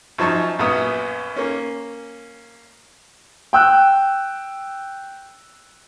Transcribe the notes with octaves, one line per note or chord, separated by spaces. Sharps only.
F#2 F3 D#4 A5 C#6
A#1 F#2 B3 D#6
A#3 C#4
G5 E6 F#6